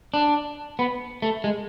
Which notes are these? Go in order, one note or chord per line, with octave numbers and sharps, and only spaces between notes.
D4
B3
A3
G#3